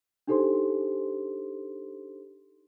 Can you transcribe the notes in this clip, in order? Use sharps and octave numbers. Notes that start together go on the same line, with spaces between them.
D4 D#4 G4 A4 C5 C6